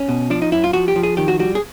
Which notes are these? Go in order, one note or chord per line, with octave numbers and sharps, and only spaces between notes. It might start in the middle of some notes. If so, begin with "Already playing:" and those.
Already playing: C#4
B2
F3 D4
D#4
F#2 E4
F4
F3 F#4
G4
F3
G#4
D#3 G4
F#4
G3 F#4
G#4